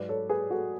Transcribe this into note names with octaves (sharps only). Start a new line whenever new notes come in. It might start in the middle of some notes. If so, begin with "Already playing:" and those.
Already playing: G#2 F#3 B4 D5
A4 C#5
G#4 B4
F#4 A4